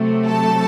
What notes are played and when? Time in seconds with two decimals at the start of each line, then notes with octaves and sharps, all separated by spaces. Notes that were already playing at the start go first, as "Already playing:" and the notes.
Already playing: C3 F#3 A3
0.26 A4 A5